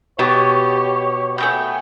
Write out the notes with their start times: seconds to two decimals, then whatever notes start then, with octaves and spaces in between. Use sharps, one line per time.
0.19 B2 G4 C#5 A5
1.38 A3 B3 C4 G5 G#5 G6